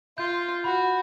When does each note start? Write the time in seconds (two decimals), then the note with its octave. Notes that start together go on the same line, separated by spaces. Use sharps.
0.18 F4 G6
0.64 F#4 B5